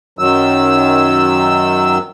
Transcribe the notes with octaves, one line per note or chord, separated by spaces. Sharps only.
F#2 D#3 F#3 E6